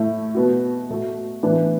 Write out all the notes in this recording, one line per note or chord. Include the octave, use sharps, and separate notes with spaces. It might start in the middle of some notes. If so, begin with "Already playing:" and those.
Already playing: A2 A3 E4
B2 B3 F#4
A2 A3 F#4
A2 E3 B3 D4